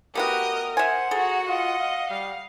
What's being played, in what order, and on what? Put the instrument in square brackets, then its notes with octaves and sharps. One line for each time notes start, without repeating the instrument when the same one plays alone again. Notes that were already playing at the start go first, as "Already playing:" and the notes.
[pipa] A3 B3 F#4 [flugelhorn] G4 [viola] A#4 [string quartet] D#5 D#6
[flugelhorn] C5 [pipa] E5 G#5 [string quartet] F#5
[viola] F#4 A#5 [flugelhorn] G#4 [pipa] A4
[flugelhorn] F4 [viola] D#5
[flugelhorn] F5
[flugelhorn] G3 [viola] F5